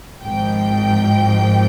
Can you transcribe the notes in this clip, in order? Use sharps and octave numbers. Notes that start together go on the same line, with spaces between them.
G#1 G#2 F3 G5